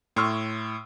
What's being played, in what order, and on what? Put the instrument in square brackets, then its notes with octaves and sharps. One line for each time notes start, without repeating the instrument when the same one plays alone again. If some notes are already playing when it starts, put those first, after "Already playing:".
[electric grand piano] A2 C#6 [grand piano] C6 E6 F6